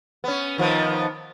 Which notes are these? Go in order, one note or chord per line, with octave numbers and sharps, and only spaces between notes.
B3 C#4
D#3 F3 B3